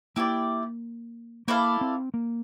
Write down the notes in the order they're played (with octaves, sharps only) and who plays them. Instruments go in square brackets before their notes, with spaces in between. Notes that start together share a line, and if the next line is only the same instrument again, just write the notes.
[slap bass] A#3 [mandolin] E4 G4 D5
[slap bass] A#3 [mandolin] E4 A4 D5 F5
[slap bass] C4
A#3